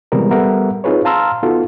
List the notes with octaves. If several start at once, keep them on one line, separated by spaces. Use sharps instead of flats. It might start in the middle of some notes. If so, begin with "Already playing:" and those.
C3 E3 G3 G#3 B3 A#4
G3 B3 A4 A#4 E5 F#5
C4 D#4 F4 G#4 B4 C#5
F5 A5 A#5 C6 E6 F6
B3 D#4 F4 F#4 A4